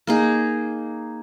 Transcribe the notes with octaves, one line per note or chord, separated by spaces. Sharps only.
A#3 D#4 G#4